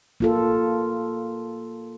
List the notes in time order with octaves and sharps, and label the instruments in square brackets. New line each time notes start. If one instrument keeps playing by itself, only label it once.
[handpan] A#3 F4 A4